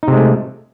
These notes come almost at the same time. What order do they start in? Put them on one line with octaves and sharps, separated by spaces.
D#4 C3 G#3 A3